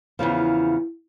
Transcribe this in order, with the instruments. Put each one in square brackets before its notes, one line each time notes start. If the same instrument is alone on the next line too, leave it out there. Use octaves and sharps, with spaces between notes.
[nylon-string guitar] E2 A2 C#3 F3